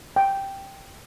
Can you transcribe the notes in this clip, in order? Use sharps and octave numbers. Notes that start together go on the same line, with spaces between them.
G5